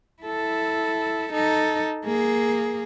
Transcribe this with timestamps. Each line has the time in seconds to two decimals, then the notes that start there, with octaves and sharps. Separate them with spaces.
0.23 E4 A4
1.33 D#4 A4
2.04 A#3 G#4